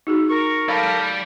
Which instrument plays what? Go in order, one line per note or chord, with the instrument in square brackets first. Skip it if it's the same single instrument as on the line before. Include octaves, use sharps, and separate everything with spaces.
[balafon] D#4 F#4 G#4
[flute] A#4 [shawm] C#6
[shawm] A4 [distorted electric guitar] D5 B5 [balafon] F5